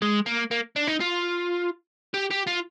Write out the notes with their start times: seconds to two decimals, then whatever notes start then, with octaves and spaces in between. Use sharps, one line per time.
0.02 G#3
0.26 A#3
0.51 A#3
0.76 D4
0.87 D#4
1.00 F4
2.14 G4
2.31 G4
2.47 F4